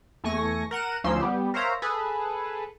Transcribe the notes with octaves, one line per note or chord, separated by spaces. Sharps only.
E2 A3 G#5 C#6 A#6
A#4 F#5 D#7 E7
D2 F3 C#4 D#4 C6 E6
G3 B3 G4
A#4 C5 C#5 E5 F5 A#5
G#4 A4 B4